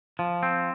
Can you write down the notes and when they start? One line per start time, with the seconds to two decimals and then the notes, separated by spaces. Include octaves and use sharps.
0.19 F3
0.43 C4